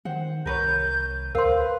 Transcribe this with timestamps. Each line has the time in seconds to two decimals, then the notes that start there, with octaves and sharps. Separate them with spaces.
0.05 D#3 C5 F#5
0.46 C2 A#4 B4 C#5 G6
1.35 D2 A#4 C5 F5 C6
1.57 B4